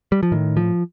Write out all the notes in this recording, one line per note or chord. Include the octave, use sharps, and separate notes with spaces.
G3
F3
A2 D#3
F3